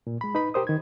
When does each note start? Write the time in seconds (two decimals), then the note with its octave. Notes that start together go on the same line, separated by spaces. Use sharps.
0.07 A#2
0.21 G#3 B5
0.35 D#4 B4 B5
0.54 G4 A#4 C5 D#6
0.67 D#3 G#6